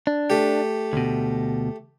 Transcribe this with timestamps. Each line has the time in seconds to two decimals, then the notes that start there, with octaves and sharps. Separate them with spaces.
0.07 D4
0.30 A3 G4
0.93 D2 B2